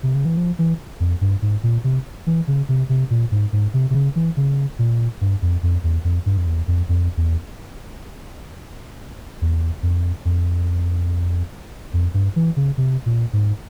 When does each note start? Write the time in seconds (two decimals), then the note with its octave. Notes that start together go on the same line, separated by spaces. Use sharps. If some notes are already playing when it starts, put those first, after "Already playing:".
0.03 C3
0.15 C#3
0.25 E3
0.37 F3
0.59 E3
1.00 F2
1.21 G2
1.42 G#2
1.63 A#2
1.84 C3
2.27 E3
2.48 C#3
2.69 C3
2.89 C3
3.11 A#2
3.32 G#2
3.53 G#2
3.74 C3
3.90 C3
3.94 C#3
4.16 E3
4.37 C#3
4.79 A#2
5.21 G2
5.42 F2
5.63 F2
5.84 E2
6.04 F2
6.26 G2
6.37 F2
6.47 E2
6.68 F2
6.89 F2
7.17 E2
9.42 E2
9.83 F2
10.25 F2
11.94 F2
12.14 G2
12.36 E3
12.56 C#3
12.78 C3
13.06 A#2
13.33 G#2